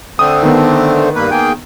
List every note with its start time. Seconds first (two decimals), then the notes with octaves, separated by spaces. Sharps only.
0.19 D3 A3 C4 D#6
0.43 D#3 B3
1.15 G2 A#3 B4
1.31 A#3 G#4 G5